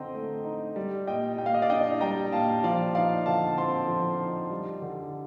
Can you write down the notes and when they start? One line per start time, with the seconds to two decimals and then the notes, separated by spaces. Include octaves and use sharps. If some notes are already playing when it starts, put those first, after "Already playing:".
Already playing: D3 C4 D#5 G5 A#5
0.15 A3
0.45 D#4
0.76 G3
1.07 A#2 D#5 G5
1.38 A#2 G5
1.46 F5
1.54 D#5
1.62 D5 F5
1.70 D4 D#5 G5
2.01 G3 G5 A#5
2.33 A#2 F5 A5
2.63 F3 D5 F5
2.95 D#4 D5 F5
3.26 D3 F5 A5
3.58 C4 A5 C6
3.88 F3
4.20 D#4
4.50 G3
4.82 D3